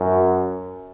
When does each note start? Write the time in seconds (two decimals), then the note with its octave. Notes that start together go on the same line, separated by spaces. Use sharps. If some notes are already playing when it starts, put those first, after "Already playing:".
Already playing: F#2